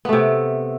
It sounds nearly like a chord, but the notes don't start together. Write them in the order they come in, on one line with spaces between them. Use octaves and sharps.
B3 A3 C3